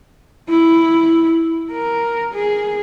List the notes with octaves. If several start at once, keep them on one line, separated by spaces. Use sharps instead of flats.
E4
A#4
G#4